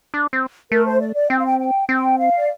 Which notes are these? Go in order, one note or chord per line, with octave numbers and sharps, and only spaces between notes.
D4
C4
A3 A#4
C5
D5
D5
C4 G5
F5
G5
G5
C4 G5
F5
D5